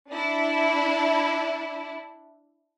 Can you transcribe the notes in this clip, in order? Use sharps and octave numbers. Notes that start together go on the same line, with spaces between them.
D4 E4